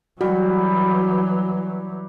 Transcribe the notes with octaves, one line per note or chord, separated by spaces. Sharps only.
E3 F#3 G3 F#4